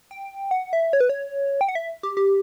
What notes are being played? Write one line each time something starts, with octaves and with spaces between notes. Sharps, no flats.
G5
F#5
E5
C#5
B4
C#5
G5
F#5
E5
G4
G4